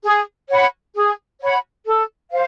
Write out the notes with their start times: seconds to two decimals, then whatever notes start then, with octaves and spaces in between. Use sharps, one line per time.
0.03 G#4
0.49 C#5 F#5 B5
0.95 G#4
1.41 C#5 F#5 B5
1.86 A4
2.32 C5 F5